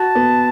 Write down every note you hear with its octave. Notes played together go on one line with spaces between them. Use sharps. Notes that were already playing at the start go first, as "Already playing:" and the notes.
Already playing: F#4 A5
B3